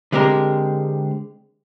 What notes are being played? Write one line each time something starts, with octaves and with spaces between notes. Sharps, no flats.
D3 G#3 C4 G4 A#4